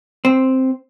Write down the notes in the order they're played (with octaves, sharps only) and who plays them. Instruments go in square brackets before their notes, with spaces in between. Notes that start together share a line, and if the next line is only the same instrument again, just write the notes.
[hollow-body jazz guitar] C4